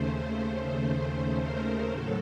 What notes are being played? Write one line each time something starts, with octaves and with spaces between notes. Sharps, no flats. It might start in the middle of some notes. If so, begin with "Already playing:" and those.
Already playing: D#2 C#3 A3 C5
C5
C5
A#4
A2 F#3 A4